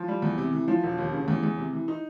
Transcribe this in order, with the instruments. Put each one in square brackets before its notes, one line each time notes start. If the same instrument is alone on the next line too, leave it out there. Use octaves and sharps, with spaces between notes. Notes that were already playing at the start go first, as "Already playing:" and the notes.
Already playing: [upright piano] F3
G3
E2
C3
E3
F3
E1
D#2
C#3
E2
E2
C3
E3
D#4